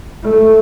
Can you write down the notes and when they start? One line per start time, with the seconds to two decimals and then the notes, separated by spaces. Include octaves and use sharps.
0.23 A3